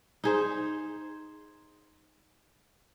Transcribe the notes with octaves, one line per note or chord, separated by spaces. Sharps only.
D#4 G#4 C5